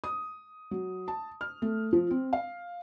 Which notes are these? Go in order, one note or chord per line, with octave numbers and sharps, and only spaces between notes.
D#6
F#3
A5
F6
A3
F3
C4
F5